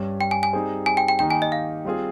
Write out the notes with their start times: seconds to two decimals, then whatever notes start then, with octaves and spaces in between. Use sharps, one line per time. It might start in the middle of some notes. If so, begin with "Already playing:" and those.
Already playing: G2 G3 C#4
0.21 G5
0.31 G#5
0.43 G#5
0.53 G3 C4 D#4 G#4 C5
0.86 G#5
0.97 G5
1.08 G5
1.19 D#3 A#3 D#4 G4 G5
1.30 G#5
1.42 D#5
1.52 F5
1.85 G3 C4 F4 G#4